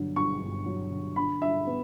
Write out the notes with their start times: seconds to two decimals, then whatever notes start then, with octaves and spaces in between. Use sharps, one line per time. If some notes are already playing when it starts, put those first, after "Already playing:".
Already playing: G1 D3 F#3
0.16 G2 C#6
0.41 G1
0.66 F#3
0.91 D3
1.16 D3 B5
1.41 G2 E5
1.67 B3